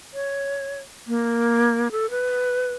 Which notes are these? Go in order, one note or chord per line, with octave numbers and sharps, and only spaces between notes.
C#5
A#3
A4
B4